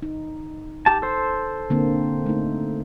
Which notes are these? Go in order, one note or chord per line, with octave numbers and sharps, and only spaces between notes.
D#4
G4 A5
A4 C5
D3 A#3 C4
A3 D#4